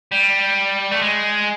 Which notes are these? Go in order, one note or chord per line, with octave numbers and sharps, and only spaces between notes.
G3
A3
G#3